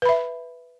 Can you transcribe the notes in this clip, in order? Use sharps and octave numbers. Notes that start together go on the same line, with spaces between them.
B4 E5 B5